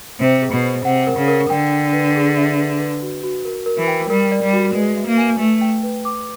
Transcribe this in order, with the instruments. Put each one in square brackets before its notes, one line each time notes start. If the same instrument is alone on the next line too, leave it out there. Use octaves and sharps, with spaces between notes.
[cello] C3 [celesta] C5
[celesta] G#4
[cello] B2
[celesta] C5
[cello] C3 [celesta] F#5
[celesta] A#4
[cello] C#3
[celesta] A#4
[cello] D3 [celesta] G5
[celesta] G5
B4
G#4
E5
B4
B4
F#4
F#4
A#4
A#4
[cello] E3
[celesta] G5
[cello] G3 [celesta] A#4
[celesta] D5
[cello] G3
[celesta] F#4
[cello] G#3 [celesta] B4
[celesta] E5
[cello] A#3
[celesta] G#5
[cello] A3 [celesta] B4
[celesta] G5
B4
D6